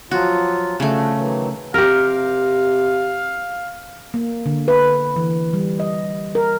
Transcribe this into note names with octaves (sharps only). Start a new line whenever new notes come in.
F3 F#3 F4 F#4
C#3 F3 A3 D4 F#4
D#3 E3 F#3
C3 G4 A#4 F5
A#3
D3
B4
E3
G3
D#5
A#4